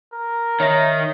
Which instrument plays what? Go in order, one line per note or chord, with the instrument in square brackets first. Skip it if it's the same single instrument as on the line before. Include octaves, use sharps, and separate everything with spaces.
[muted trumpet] A#4
[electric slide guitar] D#3 [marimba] C#5 E5 A#6